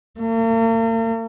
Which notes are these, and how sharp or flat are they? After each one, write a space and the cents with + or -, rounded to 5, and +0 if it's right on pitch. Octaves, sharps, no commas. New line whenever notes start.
A#3 -45